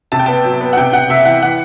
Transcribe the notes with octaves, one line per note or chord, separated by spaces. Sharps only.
C3 A5
G5
B3 A5
F#3
B3
F#5
C3 G5
C3 F#5
C3 E5
E5
E3 F#5
E3 F#5